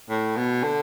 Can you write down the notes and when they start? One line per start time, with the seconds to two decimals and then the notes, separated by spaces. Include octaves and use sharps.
0.10 A2
0.37 B2
0.63 D3